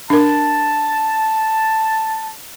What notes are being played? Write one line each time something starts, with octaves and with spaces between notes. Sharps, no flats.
D4 A#4 A5